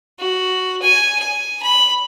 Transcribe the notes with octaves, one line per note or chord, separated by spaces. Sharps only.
F#4
G#5
G#5
B5